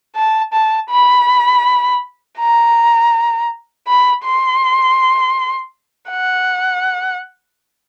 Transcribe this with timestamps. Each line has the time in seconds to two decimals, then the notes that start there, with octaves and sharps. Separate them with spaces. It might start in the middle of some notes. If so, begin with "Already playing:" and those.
0.16 A5
0.53 A5
0.90 B5
2.39 A#5
3.87 B5
4.24 C6
6.10 F#5